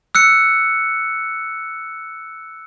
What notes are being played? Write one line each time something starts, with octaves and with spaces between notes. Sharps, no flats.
E6 F#6 C#7